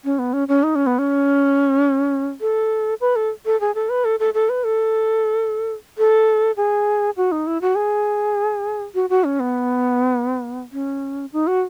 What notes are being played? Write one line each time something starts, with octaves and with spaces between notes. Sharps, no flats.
C#4
B3
C#4
C#4
D#4
C#4
B3
C#4
A4
B4
A4
A4
G#4
A4
B4
A4
A4
A4
B4
A4
A4
G#4
F#4
D#4
E4
F#4
G#4
F#4
F#4
C#4
B3
C#4
D#4
F#4